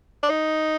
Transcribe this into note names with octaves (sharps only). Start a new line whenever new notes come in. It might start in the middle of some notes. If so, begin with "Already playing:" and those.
D4
D#4